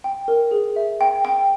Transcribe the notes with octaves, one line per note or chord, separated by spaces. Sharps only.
G5
A#4
G#4
E5
G5
G5